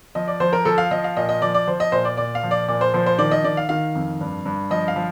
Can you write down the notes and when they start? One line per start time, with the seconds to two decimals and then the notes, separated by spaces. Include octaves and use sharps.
0.15 F3 D#5
0.28 D5
0.40 F3 C5
0.53 A#4
0.65 F3 A4
0.78 F5
0.91 F3 D#5
1.04 F5
1.17 A#2 D#5
1.29 D#5
1.42 F3 D5
1.54 D5
1.67 F3 C5
1.80 D#5
1.92 A#2 C5
2.05 D5
2.17 A#2 D5
2.35 F5
2.43 F3
2.51 D5
2.68 A#2 D5
2.81 C5
2.94 F3 C5
3.06 C5
3.18 D#3 D5
3.31 D#5
3.44 D#3 D5
3.57 F5
3.69 D#3 F5
3.95 F2
4.20 G2
4.45 G2
4.70 F3 D#5
4.88 F5
4.96 F3